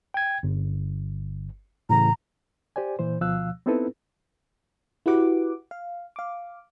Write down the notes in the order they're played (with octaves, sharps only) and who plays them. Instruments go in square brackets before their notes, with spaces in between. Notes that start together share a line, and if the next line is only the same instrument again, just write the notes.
[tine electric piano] G5 G#6
G1
[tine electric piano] A2 C#3 E3 [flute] A#5
[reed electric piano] G4 C5 D5 G#5
A#2 E3 C5
D2 B2 F3 F5 E6 F#6
B3 C4 D#4 E4 A4 B4
[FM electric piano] E4 F#4 G4 B4 F#5 D6
F5
F5 D6